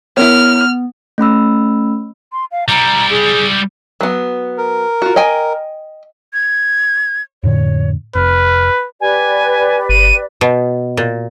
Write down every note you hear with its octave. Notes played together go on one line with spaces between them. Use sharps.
B3 E4 A#4 C#5 F6
A3 C#4 B5 E6
C6
F5
G3 E4 A#5
G#4
F#3 B3
A#4
F4 F#4
D#5 G5 G#5
G#6
F2 A2 D3 C#5
F1 B4 F6
G4 B4 D5 G#5
G1 D#7
B2
A#2